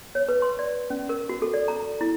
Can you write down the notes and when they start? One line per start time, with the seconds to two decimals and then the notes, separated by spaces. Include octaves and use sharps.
0.15 C#5
0.29 B4
0.42 C6
0.59 D5
0.90 C#4
1.09 A#4
1.29 F#4
1.42 A4
1.54 D5
1.68 A#5
2.01 E4